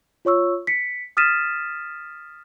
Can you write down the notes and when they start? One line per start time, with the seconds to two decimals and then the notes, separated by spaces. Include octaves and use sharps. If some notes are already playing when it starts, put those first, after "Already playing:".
0.25 F4 C#5 C#6 E6
0.67 B6 C#7
1.17 D#6 F6 A6 B6 D#7 E7